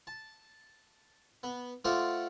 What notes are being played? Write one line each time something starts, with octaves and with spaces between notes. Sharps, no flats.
A5
B3
A3 F4 A4 C5 D5 F#5